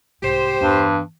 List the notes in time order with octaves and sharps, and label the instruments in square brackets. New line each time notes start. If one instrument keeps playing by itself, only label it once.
[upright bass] C2 G#2 [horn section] G4 C5
[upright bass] E2 D4 [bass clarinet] G2